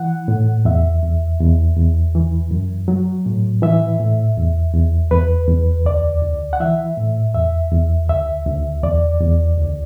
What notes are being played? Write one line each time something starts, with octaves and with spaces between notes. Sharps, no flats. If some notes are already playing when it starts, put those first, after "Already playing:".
Already playing: E3 F#5
A2
E2 E5
E2
E2
E2
E3
F#2
F#3
A2
E3 E5
A2
E2
E2
E2 B4
E2
D2 D5
D2
F#5
E3 E5
A2
E2 E5
E2
D2 E5
D2
E2 D5
E2
D2